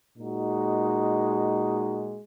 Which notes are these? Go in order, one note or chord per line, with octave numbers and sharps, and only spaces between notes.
A#2 G#3 D#4 F#4